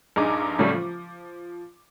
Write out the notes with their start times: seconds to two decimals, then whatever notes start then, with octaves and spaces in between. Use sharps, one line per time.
0.16 A#1 G2 D#4 G#4 A#5 D6
0.58 C2 A2 C#3 F#3 G3 A3
0.73 F3